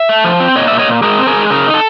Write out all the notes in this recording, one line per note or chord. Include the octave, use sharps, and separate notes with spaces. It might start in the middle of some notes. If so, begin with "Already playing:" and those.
Already playing: E5
A3
F3
C4
A#2 C#5 D#5
D5 E5
A#2
C#5 D#5
A#2
G#3 G#4 A#4
C4
G#4 A#4
G#3
C#3 G#4 A#4
D#4
A4